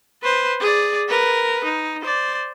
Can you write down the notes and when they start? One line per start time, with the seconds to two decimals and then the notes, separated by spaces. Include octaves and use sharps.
0.23 B4 C5
0.60 G#4 D5
1.09 A#4 B4
1.65 D#4
2.02 C5 D5